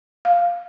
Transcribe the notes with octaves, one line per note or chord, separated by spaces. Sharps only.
F5